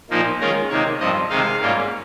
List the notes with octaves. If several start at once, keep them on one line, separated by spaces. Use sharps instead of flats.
A#2 F3 A#3 D#4
D#3 G#3 C#4 F4 A#4
C3 D#3 A#3 D#4 C#5
G2 F3 C4 D#5
C3 D#3 G#3 D#4 F5
G#2 G3 A#3 C#4 F4